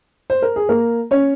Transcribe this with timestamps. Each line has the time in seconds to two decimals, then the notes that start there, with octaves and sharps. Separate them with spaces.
0.30 C5
0.42 A#4
0.56 G#4
0.69 A#3 A#4
1.11 C#4 C#5